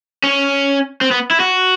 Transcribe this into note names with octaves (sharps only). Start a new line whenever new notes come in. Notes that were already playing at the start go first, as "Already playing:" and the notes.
C#4
C4
B3
E4
F#4